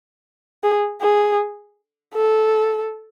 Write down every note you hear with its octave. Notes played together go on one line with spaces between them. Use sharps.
G#4
G#4
A4